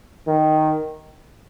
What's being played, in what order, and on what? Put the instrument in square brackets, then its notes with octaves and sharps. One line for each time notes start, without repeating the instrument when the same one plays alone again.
[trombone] D#3